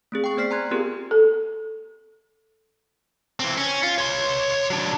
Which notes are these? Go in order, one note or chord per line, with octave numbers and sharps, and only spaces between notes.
A3 C4 G#4
G5 C#6
B3 C5 D5 F6 B6 C7
G#5 A#5 C6 F#6 G#6
B3 C4 F4 G4 G#4 A#4
A4
E3 C4
C#4
F4
C#5 C6
F#3 D4